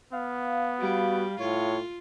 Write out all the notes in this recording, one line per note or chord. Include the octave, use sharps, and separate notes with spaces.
B3 F5
G3 F#4
A2 F4 C#5